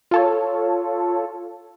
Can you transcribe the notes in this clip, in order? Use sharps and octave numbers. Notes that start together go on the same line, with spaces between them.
F4 A4 C#5